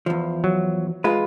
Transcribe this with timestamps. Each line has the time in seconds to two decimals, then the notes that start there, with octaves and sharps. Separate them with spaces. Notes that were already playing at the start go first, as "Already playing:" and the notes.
0.06 E2 F3
0.44 F#3
1.04 G#3 F4 B4